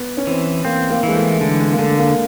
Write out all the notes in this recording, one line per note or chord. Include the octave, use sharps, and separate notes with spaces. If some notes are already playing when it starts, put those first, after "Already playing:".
Already playing: B3
C#4
E3 C4
A#3 C4
A#3
E3 G#3
A3
D3 G#3
G#3
A#3
D3 A3
A#3